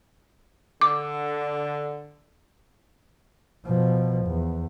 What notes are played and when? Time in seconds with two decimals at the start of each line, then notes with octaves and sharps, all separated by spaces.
0.81 D3 D6
3.65 B2 F3
4.26 E2